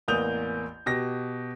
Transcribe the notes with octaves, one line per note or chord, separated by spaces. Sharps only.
A1 E2 A#3 D#6 G6 F7
B2 G4 A#6